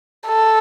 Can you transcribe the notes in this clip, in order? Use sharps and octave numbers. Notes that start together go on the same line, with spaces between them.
A4